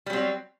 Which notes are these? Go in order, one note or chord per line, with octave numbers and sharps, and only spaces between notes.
F#3 G3 C4